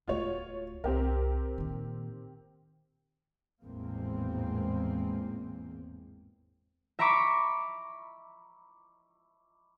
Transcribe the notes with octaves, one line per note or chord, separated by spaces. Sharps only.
D1 A3 F4 F#4 C#5
C2 C4 G4 A#4
A#2 D#3
G#1 E2 A2 G#3 A#3 C4
E5 A#5 B5 C#6 D6 B6